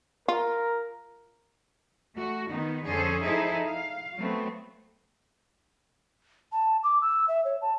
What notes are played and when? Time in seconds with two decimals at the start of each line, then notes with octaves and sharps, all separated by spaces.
0.28 F4 A#4
2.16 A3 F#4
2.49 D#3 B3 D#4
2.85 F2 D3 C#4 G#4 A4 C5
3.22 F3 D#4 E4 G#4 A4 C5
3.66 F5
4.17 F#3 A3 B3 C4
6.52 A5
6.83 D6
7.02 E6
7.28 E5
7.45 C#5
7.62 A5